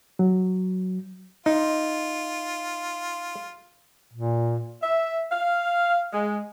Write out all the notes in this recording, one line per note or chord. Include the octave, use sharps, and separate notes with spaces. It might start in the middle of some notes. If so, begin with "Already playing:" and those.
F#3
D#4 F4
A#2
E5
F5
G#3